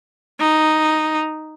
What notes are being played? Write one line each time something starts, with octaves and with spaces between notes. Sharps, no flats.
D#4